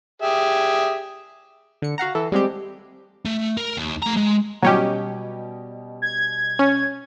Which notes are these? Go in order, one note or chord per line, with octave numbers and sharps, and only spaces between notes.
G4 G#4 E5
D3 C#7
F#4 F5 F#5 A#5
E3 A4
G3 G#3 C4 G4
A3
A#4
D#2
A3 A#5
G#3
B2 F#3 G3 C#4 G4 D#5
G#6
C#4